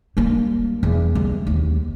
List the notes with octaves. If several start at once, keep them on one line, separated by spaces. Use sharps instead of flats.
G3 A#3
E2
G3 G#3
D#2